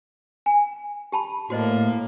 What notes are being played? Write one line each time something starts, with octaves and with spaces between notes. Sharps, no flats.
G#5
G4 A5 B5
A2 A#3 F#4 C5 D#5